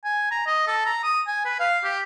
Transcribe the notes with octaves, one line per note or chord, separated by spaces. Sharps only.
G#5
A#5
D#5
A4
A#5
D#6
G#5
B4
F5
G4